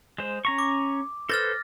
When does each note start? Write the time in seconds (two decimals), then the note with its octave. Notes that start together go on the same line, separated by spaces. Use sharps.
0.18 G#3 C5
0.45 C#4 A#5 C#6
0.58 D6
1.29 A4 B4 C5 F6 A6 A#6